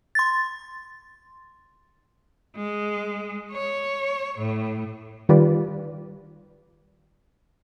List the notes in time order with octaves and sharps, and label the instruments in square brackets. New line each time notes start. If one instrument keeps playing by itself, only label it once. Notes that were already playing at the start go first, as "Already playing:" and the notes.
[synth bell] C6 A6
[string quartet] G#3
C#5
A2
[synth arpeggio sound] D#3 G3 F4 G4 B4 D5